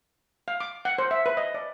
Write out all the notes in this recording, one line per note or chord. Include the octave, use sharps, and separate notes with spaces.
F5
D6
F#5
C5
E5
B4
D#5
D5